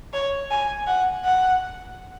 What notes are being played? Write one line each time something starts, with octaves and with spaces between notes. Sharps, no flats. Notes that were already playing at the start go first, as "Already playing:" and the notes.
C#5
G#5
F#5
F#5